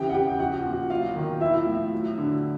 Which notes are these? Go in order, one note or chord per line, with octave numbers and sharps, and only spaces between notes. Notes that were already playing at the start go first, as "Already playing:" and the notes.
Already playing: C#3 E3 G4 G5
F#5
C#3 G4 G5
F3 F#4 F#5
A#2
F#3 F4 F5
D#3
F3 E4 E5
A2
F#3
D3